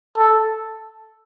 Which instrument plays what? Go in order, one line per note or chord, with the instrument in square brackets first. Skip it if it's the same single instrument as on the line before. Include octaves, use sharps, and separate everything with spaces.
[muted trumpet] A4